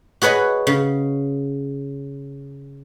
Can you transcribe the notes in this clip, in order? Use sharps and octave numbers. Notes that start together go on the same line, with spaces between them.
F#4 G#4 B4 C#5 D#5
C#3